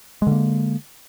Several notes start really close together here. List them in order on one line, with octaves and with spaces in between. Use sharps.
G#3 D3 A#3